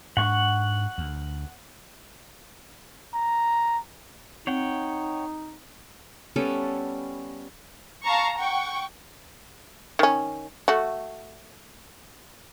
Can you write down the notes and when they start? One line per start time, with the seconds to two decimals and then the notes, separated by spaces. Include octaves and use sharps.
0.17 G#2 D4 F#5 C#6
0.98 D2
3.14 A#5
4.47 C4 D#4 C#5 F#5 G5
6.36 G3 B3 C#4 A4
8.03 F5 A5 A#5 C#6
8.38 F#5 G5 C#6
9.99 D#3 C#4
10.68 A3 F#4